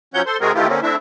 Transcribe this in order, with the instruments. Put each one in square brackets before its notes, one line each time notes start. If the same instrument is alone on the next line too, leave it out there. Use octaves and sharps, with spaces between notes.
[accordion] F3 F#3 C#4 C#5 F#5 G6
A4 C5 C6
C3 G#3 C4 F#4 G#4 A#4
D#3 E3 A3 E4 F4 G4
D3 A#3 C4 C#4
A3 C4 D4 E4 E5